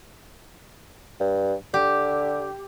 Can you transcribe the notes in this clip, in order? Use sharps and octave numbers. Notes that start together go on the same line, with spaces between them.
G2
D3 G4